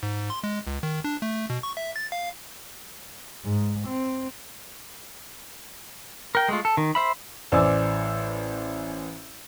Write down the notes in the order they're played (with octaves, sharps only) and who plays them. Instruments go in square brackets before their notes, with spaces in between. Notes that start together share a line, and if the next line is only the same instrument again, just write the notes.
[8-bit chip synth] G#2
C6
G#3
C#2
D#3
D4
A3
B2
C#6
E5
A6
F5
[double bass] G#2
C4
[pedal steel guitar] A#4 G5
G#3 A3 F4
A4
D#3
C5 E5 B5
[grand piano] A1 C5 D5 G#5 E6